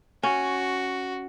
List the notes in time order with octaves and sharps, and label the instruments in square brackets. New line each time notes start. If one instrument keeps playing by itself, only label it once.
[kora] C#4 [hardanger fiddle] F#4